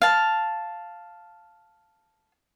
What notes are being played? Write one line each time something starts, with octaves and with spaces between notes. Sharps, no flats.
F5 A5